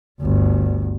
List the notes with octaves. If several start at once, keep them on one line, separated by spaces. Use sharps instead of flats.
G1 D2